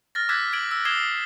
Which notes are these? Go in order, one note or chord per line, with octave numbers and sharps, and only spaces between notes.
F6 A6 A#6
D6 E6 F#6 G#6 A6 B6
F6 G#6 D7 F#7
E6
D6 D#6 G#6 C7 E7 G7